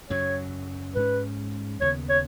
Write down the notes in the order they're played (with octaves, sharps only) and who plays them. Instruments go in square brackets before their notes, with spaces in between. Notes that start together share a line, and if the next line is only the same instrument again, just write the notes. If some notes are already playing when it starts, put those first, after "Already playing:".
[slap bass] F#2 C#3 F#3 [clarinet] C#5
[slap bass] G#2 G#3 C#4 [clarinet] B4
[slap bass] D#2 C#3 B3 [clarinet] C#5
[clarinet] C#5